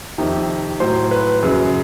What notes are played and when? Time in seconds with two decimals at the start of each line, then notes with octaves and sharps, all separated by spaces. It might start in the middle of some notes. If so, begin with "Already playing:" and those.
0.18 F2 C3 D#3
0.80 A2 F#3 C5
1.11 B4
1.42 F#2 C#3 F#3 G#4